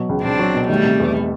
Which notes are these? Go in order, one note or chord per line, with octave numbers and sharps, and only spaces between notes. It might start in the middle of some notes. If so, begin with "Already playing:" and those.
Already playing: B2 F#3
C#2
C#2 C4 D4
F#3
B2
D#3 G3 A3
C3
E2